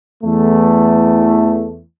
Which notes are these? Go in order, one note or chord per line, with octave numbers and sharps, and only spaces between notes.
E2 E3 A3